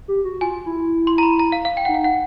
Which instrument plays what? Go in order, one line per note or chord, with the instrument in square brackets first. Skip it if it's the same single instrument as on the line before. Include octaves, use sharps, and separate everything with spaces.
[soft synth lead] G4
F#4
[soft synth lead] F4 [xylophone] G#5
[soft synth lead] E4
[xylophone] C6
A#5
B5
A#5
F5
F5
G5
[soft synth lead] D#4 [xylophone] F#5
[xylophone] F5
F#5